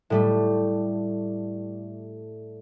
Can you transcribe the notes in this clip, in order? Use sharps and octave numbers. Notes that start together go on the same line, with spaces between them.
A2 G3 A3